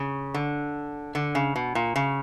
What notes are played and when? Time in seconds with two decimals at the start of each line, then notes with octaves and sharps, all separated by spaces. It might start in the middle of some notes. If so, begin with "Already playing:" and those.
Already playing: C#3
0.34 D3
1.15 D3
1.35 C#3
1.56 B2
1.75 A#2
1.96 C#3